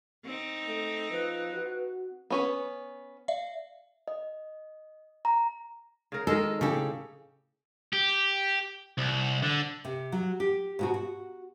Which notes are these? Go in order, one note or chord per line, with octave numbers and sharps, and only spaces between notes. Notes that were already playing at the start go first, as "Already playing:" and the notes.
C4 D#4
A3
F3 B4
F#4
B3 C#4 B4
D5 E5 F5
D#5
A#5
C#3 A#4
D#3 G#3 A4 A#4
A2 C#3 G4 A4
G4
C2
D3
C3
F#3
G4
G#2 B2 F#4
F#4